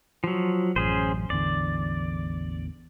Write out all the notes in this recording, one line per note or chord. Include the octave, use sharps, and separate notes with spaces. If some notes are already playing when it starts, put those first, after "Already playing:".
F3 F#3
A1 F#2 C#4 G#4 C5
A1 E2 D3 D5